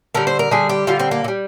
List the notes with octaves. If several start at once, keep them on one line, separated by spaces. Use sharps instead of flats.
D3 G3 A#4
C5
A#4
D3 G3 G#4
G4
D3 G3 F4
C4
A#3
D3
G3